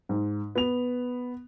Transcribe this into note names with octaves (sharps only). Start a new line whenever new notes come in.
G#2
B3 F7